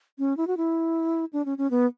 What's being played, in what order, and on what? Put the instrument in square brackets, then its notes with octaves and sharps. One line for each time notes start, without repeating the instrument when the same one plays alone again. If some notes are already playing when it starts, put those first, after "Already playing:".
[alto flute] C#4
E4
F#4
E4
D4
C#4
C#4
B3